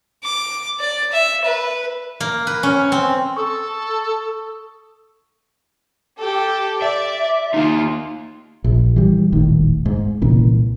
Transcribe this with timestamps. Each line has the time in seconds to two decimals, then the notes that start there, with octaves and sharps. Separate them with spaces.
0.24 D6
0.80 D5
1.13 E5
1.45 B4
2.20 A#3
2.47 B4
2.63 C#4
2.92 C4
3.37 A4 C#6 D#6 E6
6.18 G4 A4
6.82 D5 E5
7.54 A#3 D#4 F4
8.64 A#1
8.96 E3 G3
9.32 D#1 G#1 A2 D#3
9.86 G#2
10.22 C2 A#2 C#3 E3